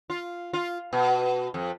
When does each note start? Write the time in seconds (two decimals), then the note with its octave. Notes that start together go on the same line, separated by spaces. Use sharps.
0.10 F4
0.53 F4
0.93 B2
1.54 F2